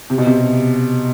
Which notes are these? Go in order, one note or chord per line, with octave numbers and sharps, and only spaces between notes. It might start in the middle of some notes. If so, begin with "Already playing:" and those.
C3
B2
C3